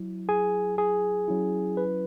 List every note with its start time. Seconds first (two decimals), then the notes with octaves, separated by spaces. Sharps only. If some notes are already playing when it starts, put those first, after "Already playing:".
Already playing: F#3 E4
0.29 G#4 G#5
0.78 G#4 G#5
1.28 F#3 C#4 E4
1.77 B4